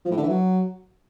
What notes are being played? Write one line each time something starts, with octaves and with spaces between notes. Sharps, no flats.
F3
A2
D3
E3
F#3